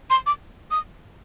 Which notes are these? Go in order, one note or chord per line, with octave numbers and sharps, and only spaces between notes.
C6
D6
D#6